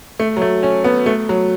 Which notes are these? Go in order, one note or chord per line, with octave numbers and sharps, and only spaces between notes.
A3
F#3
A3
C#4
B3
A3
F#3